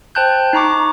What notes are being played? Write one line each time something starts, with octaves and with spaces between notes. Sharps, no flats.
C5 G5 A5 F#6 G6
D#4 A#5 C#6 D6